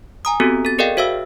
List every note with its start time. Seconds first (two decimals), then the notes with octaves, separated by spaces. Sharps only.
0.25 G#5 A#5 D#6
0.40 B3 C4 F#4 G4 A4
0.65 A4 A6
0.79 G#4 A#4 D5 D#5 F5 G5
0.97 F#4 C5 E5 F5 E6